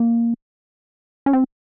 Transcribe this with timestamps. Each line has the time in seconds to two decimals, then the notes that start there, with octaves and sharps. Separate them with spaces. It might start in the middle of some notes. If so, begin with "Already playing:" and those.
Already playing: A#3
1.26 C#4
1.33 C4